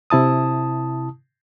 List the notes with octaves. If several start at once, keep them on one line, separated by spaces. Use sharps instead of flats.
C3 E4 A5 D#6